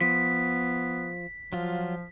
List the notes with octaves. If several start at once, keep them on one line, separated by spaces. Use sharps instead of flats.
F3 B3 B6
F3 F#3 F4